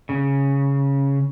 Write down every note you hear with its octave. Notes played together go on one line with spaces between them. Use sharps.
C#3